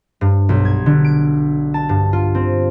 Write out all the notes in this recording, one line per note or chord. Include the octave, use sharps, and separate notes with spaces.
G2
B1
G#6
D3
D7
A5
G2
F4
C4